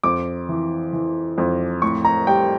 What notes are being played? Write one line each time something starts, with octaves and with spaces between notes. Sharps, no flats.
F2 D6
E3
E3
F2
A2 C#6
A#5
G3 G5